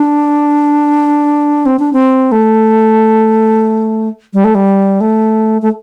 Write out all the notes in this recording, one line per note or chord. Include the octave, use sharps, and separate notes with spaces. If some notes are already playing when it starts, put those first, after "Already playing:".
Already playing: D4
C4
D4
C4
A3
G3
A3
G3
A3
A3